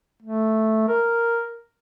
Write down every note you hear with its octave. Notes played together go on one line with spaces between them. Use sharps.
A3
A#4